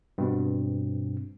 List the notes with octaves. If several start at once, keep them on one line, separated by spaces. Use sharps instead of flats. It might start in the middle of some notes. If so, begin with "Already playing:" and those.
G2 B2 C4